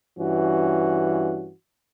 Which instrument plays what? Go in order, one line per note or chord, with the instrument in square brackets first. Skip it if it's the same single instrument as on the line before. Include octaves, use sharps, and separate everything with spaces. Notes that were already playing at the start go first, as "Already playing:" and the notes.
[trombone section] G2 E3 C#4 F#4